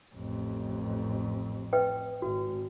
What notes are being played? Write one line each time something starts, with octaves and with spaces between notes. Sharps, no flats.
A1 F2
B4 D#5 G5
G#1 F#4